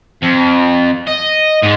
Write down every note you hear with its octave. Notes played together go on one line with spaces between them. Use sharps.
F2
D#5
G#2 G#3